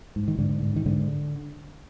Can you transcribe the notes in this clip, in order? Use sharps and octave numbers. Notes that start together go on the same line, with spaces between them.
G#2
D#3
G#2 D3
G#2
D#3
G#2 D3